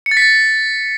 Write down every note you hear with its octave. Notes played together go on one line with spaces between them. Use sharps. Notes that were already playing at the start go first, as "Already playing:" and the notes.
C#7
A6
B6
A6